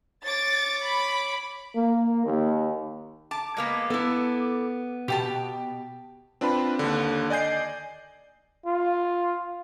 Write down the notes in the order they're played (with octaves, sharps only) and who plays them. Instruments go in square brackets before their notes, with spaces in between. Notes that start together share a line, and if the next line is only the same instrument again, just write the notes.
[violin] C#5 D6 [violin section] A6
[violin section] B5
[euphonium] A#3
D#2
[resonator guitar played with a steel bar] A5 [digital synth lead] D6
[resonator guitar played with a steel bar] G#3 A#3 B3
[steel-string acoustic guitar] B3 [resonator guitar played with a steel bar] E4 A4
[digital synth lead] B2 [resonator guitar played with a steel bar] G4 G5 A5
[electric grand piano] C4 D4 F4 B4 B5
D#2 D3
D5 D#5 G#5 G6 C7
[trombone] F4